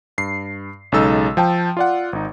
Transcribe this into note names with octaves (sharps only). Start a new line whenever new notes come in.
G2 C7
B1 C#3 G#3 D#4 A4 E6
F3 G5 A5
F4 D5 F#5
G#1 D#4